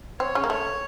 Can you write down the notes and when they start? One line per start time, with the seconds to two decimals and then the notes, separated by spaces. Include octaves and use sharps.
0.20 C4 C#5
0.35 C#3 C#4
0.44 A#3
0.50 A3 C#5